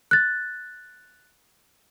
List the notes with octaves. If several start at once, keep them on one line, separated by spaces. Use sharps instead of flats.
F#6 A6